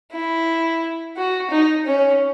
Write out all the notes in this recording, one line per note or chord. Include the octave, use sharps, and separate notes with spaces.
E4
F#4
D#4
C#4